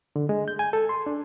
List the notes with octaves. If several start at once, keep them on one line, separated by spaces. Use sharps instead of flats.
D3
G#3
G6
G#5
A4
C6
D4